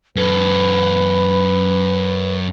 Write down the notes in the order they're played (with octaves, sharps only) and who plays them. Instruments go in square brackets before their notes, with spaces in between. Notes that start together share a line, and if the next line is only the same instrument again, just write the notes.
[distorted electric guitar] F#2 A4 [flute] B4